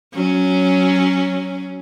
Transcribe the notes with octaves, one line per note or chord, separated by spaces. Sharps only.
F#3 C#4